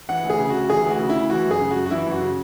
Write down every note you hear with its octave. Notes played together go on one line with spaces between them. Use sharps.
E3 F#5
D2
G#4
C#3
D2 F#4
E3 G#4
D2
F#4
C#3
D2 E4
E3 F#4
F#2 G#4
C#3
F#4
F#2
F#4
E3 E4
F#2 F#4
C#3